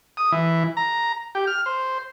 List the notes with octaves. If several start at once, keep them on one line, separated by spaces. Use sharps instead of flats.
D#6
E3
A#5
G4
F6
C5